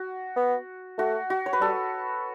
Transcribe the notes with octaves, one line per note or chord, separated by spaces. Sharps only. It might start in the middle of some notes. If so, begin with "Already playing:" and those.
Already playing: F#4
B3
A3 F#4
F#4
C#5
B4
G3 A4